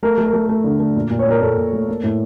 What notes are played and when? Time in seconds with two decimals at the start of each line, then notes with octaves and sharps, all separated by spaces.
0.03 A3 A#4
0.18 A3
0.26 A#4
0.33 A3
0.49 A3
0.64 D3
0.80 A3
0.96 A#2
1.10 A#2
1.19 C#5
1.27 A#2 A#4
1.42 A#2 A4
1.57 A#2
1.73 A3
1.88 A#3
2.04 A2